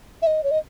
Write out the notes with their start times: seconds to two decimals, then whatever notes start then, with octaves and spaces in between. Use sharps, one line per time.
0.22 E5
0.27 D#5
0.44 C#5
0.51 D#5